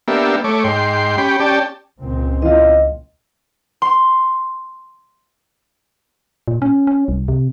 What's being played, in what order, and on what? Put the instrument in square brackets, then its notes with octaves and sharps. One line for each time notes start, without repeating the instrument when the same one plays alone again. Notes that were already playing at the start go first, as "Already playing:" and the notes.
[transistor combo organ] A#3 B3 D4 G4 E5
A3 C#5 D6
G#2 G5 C6
C#4 G4 G5 B5
C#4 G4 D5 G5 A5
[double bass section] C#2 A#2 C4
[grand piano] E3 F4 [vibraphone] D#5
[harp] C6
[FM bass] A#2
C#4
C#4
C2
C3